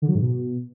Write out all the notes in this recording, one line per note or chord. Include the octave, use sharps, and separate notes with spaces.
D3
F#3
G#2
B2